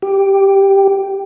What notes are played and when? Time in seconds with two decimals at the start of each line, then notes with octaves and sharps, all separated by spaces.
0.02 G4